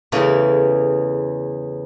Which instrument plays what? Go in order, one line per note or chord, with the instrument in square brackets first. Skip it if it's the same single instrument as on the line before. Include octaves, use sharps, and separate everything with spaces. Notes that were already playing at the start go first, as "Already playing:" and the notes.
[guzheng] E2 C#3 E3 A3 C#4